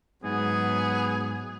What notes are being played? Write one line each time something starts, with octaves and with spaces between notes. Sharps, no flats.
G#2 F#3 B3 G#4